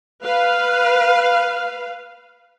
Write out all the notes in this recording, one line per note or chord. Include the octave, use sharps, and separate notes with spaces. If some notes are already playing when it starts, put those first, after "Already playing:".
B4 F5